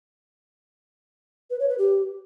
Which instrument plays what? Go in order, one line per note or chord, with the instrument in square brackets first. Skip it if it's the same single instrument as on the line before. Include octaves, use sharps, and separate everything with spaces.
[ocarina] B4
C#5
B4
G4